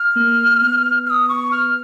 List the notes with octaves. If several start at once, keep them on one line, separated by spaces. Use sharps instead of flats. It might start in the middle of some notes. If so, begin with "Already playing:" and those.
Already playing: F6
A#3
B3
F6
D#6
C#6
F6